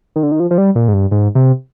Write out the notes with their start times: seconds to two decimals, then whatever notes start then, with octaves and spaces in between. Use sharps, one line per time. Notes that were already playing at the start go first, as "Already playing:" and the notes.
0.16 D#3
0.23 D3
0.32 D#3
0.40 F3
0.51 F3
0.58 G3
0.75 A#2
0.88 G#2
0.94 G2
1.11 G#2
1.35 C3